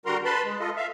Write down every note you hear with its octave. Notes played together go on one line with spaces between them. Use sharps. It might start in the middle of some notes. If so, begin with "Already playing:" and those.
D3 G3 F#4 A#4 A#5 C6
B4 A5 B5 C6
G#3
F4 A4 D#5
E5 F5